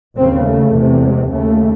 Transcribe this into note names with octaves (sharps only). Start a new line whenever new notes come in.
D#2 C#3 C4
A3
E2 C3
G#3
D#2 C#3 A3